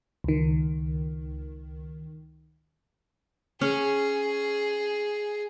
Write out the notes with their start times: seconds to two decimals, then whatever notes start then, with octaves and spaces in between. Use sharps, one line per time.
0.24 C#2 D#3
3.61 C#4 G#4